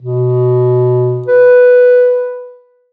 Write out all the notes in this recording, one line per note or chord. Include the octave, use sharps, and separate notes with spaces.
B2
B4